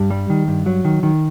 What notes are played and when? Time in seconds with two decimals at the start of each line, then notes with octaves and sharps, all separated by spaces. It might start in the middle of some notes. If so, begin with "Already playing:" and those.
Already playing: G2
0.10 G3
0.30 D#3
0.48 G2
0.66 F#3
0.85 D#3
1.03 D#3